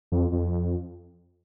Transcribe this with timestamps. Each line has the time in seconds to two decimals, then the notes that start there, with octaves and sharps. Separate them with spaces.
0.12 F2
0.32 F2